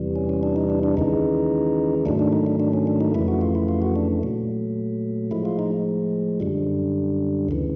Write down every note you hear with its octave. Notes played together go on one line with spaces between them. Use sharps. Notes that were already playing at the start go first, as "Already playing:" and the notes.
Already playing: E2 C3 E3 G3
C#4
C#4
D4
D#4
D4
D4
D#2 C#3 E3 G#3 D#4
G#2 D#3 F#3 A3 D4
D4
D#4
D4
D4
C#4
D4
D#4
F2 C#3 E3 A3 E4
F#4
F4
E4
F4
F#4
D4
A#2 F#3 A3
A2 F3 G#3 E4
F4
D#4
F#2 D3 G3
D2 C#3 E3